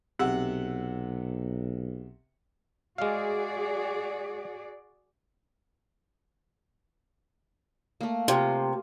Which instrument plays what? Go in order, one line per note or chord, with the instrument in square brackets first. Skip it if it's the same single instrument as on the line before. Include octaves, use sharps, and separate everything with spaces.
[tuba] B1 [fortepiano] C3 F#5 E6
[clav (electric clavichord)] G#3 F5 [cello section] F#4 G#4 D5
[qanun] A3 A#3
[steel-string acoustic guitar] C3 [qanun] F4